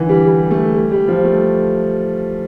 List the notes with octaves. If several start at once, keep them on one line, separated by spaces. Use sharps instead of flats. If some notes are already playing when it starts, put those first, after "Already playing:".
Already playing: D3 E3
G3
G3
A3
G3
G3
F3
A3